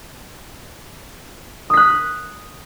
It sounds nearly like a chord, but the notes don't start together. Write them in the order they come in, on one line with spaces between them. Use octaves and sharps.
D#6 B6 F#6